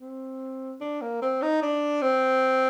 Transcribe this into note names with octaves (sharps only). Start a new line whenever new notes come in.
C4
D4
A#3
C4
D#4
D4
C4